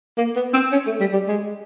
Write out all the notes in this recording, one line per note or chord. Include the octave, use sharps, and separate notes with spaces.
A#3
B3
C4
C#4
A3
G3
G3
G#3